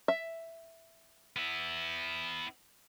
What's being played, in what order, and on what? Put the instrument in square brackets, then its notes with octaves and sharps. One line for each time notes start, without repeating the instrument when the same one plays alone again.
[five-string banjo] E5
[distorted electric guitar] B3 E4